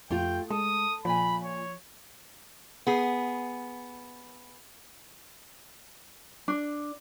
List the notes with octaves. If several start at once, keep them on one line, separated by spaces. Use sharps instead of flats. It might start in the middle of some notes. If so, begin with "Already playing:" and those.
F2 A3 F4 G4 G5
G#3 A4 D#6
A#2 F3 F4 G#5 B5
C#5
B3 G#4
D4